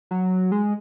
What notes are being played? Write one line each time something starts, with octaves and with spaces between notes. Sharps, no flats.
F#3
G#3